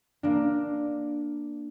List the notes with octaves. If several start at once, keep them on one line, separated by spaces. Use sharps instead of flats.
A#3 D4